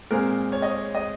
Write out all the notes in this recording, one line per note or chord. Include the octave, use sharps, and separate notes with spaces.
A#2 G#3 C4 A#4
C#5
D#5
C#5
D#5